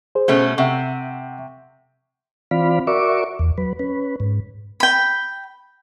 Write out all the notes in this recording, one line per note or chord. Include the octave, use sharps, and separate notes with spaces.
G#4 C5
B2 A3 C#4
C3 E5 F#5 C#6
E3 C4 F4 D5 F5 B5
F#4 A#4 D5 E5 C#6 D6
E2
F#3 B4
C#4 B4
G#2
G5 B5